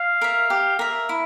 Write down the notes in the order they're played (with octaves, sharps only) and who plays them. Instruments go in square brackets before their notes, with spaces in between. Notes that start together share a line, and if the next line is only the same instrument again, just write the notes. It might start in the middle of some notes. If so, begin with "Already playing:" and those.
Already playing: [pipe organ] F5
[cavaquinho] A#4 E5
G4
A#4 E5
E4